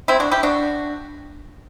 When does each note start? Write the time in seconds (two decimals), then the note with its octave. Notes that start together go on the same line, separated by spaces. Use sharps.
0.08 C4 E4
0.20 D4 F#4
0.31 E4 G4
0.43 D4 F#4